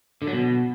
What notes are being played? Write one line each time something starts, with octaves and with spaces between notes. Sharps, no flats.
D3
F#3
B2